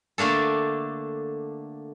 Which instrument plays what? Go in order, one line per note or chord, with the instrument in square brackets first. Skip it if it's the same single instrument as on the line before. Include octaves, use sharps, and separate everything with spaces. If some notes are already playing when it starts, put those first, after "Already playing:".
[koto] D3 A3 A#3 D4 A4